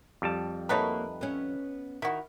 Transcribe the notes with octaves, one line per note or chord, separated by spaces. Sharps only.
F2 G3 A5
A3 A#3 D#4 F#4 B4 C#5
B3 C#4
D#3 E4 F#4